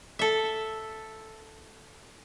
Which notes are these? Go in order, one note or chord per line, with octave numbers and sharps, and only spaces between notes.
A4 E5